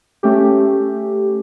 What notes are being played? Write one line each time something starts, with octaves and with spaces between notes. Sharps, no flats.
A3 C#4 G4